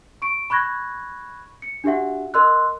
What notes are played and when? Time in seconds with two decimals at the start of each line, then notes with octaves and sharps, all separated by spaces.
0.22 C#6 D7
0.50 B5 C#6 F#6 G#6 A#6
1.62 C#7
1.84 D4 F#4 G4 E5 F#5
2.34 A#4 D#5 C6 E6 F#6